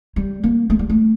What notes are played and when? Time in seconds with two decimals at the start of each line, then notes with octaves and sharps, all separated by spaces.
0.16 G3
0.43 A#3
0.70 A3
0.79 G3
0.89 A3